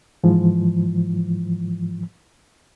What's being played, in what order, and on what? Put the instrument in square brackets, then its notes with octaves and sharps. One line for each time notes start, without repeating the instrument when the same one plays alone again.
[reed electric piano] G#2 E3 F3